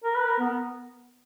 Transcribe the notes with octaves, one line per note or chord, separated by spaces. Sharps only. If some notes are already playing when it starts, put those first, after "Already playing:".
A#4
B4
A#4
B3